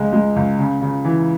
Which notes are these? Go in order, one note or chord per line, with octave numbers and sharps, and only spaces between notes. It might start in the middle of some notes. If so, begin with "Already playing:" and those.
Already playing: C#2 G#3
G#3
C#2
C#3
C#3
E3